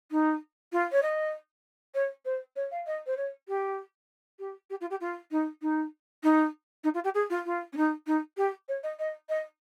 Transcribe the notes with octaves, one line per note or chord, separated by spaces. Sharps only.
D#4
F4
C#5
D#5
C#5
C5
C#5
F5
D#5
C5
C#5
G4
G4
G4
F4
G4
F4
D#4
D#4
D#4
D#4
F4
G4
G#4
F4
F4
C#4
D#4
D#4
G4
C#5
D#5
D#5
D#5